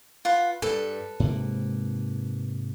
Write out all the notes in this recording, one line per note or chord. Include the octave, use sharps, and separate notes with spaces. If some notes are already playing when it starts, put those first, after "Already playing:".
F4 B4 F#5
G2 A4 B4
G#2 C3 A#3